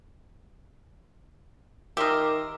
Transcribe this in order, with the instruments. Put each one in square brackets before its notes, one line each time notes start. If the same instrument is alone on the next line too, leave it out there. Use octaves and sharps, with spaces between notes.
[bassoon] D#3 [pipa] G4 A#4 [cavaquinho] E5 C6 D#6 [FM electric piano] D6